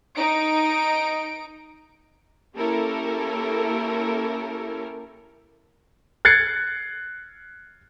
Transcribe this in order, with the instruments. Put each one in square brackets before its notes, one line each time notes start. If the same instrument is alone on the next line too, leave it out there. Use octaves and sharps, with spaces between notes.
[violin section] D#4 D7
[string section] A#3 C#4 E4 G4 A4 A#4
[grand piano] F#6 G#6 A6 C7 C#7